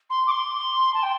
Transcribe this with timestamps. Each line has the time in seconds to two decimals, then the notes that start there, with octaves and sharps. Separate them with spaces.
0.09 C6
0.26 D6
0.31 C6
0.94 A5
1.02 G5